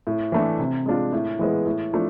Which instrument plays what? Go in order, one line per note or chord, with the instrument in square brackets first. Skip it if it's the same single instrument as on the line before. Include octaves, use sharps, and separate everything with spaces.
[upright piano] A2
E3 A3 D4
C3
G#3 D4 F4
A2
E3 G#3 B3
A2
F3 A3 D4